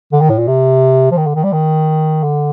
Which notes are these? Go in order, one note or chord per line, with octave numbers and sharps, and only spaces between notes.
D3
D#3
A2
A#2
C3
F3
D#3
D3
D#3
G3
D#3
D3